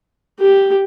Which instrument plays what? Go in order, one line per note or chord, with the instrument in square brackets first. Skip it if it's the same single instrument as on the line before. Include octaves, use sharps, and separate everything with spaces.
[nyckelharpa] G4